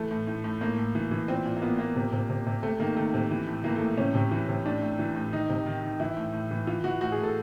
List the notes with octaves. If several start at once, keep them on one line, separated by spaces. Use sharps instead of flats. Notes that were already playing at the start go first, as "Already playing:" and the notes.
Already playing: E3 A3
A2
A2
A2
A2 A#3
A2
E3
E3
A#2 C4
A#2
A#3
A#2 B3
A#2 A#3
C3
C3
C3
C3
C3 A3
D#3 A#3
D#3 A3
C3
E3
A2
E3 A#3
A3
A2
C3 C#4
C3
E3
C3
A2 D4
A2
E3
A2
D#3 D#4
C3
D#3
D#3
E3 E4
A2
A2
E3
E3 F4
E3 F#4
A2 F#4
G#4
A2
A4